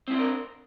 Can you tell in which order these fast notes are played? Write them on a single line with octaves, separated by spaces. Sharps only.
C4 E4 C5 D4 A#4